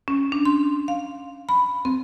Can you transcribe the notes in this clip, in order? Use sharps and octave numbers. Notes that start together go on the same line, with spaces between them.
C#4
D4
C6
F5
B5
C4